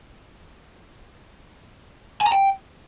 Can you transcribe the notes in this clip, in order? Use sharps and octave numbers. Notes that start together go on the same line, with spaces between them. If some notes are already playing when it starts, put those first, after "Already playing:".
G#5
A#5
G5